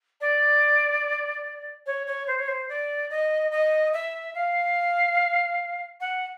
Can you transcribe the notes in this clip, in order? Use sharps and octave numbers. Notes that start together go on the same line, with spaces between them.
D5
C#5
C#5
C5
C#5
C5
D5
D#5
D#5
E5
F5
F#5